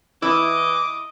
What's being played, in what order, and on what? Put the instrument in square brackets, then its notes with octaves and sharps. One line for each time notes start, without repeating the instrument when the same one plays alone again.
[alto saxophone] E3 [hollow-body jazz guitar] E4 [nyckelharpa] D#5 [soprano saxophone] D6